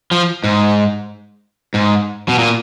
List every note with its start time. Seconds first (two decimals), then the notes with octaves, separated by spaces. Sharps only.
0.11 F3
0.44 G#2
1.74 G#2
2.28 B2
2.39 A#2